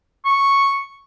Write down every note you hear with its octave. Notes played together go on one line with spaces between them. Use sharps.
C#6